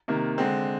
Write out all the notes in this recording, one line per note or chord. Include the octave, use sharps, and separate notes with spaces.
C3 D#3 A#3
D3 G#3 C4